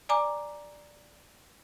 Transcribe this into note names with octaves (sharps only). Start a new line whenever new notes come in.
D5 G#5 A#5 D6